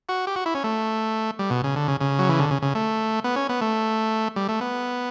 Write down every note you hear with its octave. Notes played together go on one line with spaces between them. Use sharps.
F#4
G4
F#4
E4
C#4
A3
G3
B2
C#3
D3
C#3
C#3
F#3
E3
D3
C#3
C#3
A3
B3
C#4
B3
A3
G3
A3
B3